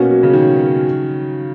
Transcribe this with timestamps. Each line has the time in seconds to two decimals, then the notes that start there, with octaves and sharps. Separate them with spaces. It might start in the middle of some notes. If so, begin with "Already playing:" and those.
Already playing: B2 A#3 C#4 F#4
0.10 F#3
0.23 C#3
0.33 D#3